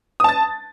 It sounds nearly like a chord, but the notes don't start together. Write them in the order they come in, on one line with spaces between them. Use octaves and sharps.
D#6 A5 A6